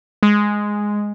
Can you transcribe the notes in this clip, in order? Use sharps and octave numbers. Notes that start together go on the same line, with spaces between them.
G#3